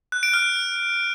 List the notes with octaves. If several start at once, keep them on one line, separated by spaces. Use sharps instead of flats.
F#6
D7
F6